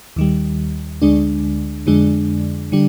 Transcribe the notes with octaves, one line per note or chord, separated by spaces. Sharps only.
D#2 D#3 G3
D2 D3 G#3 D4
F2 D3 G#3 D4
D3 G3 D4